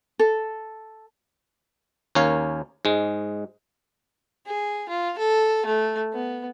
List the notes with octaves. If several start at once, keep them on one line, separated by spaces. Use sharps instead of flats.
A4
D#2 C#4 A#4 C#5 F5
G#2 G#3
G#4
F4
A4
A3
B3